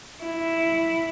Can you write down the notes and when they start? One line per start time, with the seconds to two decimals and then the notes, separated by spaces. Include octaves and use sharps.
0.23 E4